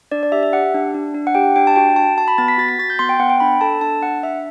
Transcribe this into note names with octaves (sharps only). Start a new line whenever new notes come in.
D4 D5
D5
G4 E5
E5
G4 F#5
D4
D4
D4
F#5
G4 G5
D4 G5
A5
F#4 G5
F#4 A5
F#4 A5
B5
B3 A6
B6
F#4 A6
B6
F#4 A6
G6
B3 C6
G5
B3 F#5
G5
D4 B5
A4 A5
D4 A5
D4 F#5
D4 E5